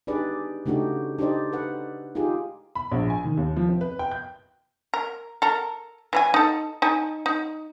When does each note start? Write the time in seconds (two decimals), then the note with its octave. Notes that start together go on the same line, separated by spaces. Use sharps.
0.07 D4 D#4 G4 G#4 B4 D5
0.66 C#3 A3 D4 D#4 F#4 G4
1.19 D4 D#4 G4 C5 D5 D#5
1.52 A4 B4 F#5
2.15 D#4 F4 G4 G#4
2.75 B5
2.91 A#1
3.10 G#5
3.24 D#3
3.37 D#2
3.56 F3
3.69 C4
3.81 B4
3.99 G5
4.11 G6
4.94 A#4
5.42 A4 A#4
6.13 E3 E4 G#5
6.34 D#4 A4
6.82 D#4 A4 G#5
7.26 D#4